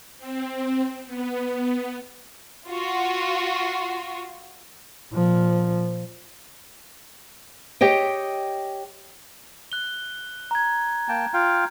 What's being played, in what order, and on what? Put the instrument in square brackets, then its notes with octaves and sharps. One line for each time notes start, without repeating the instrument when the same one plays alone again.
[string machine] C4
B3
[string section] F4 F#4
[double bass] A#2 F3
[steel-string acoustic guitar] G4 C#5 D#5 G5
[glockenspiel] F#6 G7
A#5 G#6
[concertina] A#3 G5 A5
F4 F5 G5